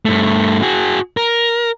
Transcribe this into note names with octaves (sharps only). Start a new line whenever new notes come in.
G2 A3
F#4 G#4
A#4